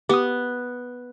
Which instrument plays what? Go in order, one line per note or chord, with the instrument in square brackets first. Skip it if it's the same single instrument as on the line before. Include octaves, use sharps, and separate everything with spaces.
[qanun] B3 [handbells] G4 D#6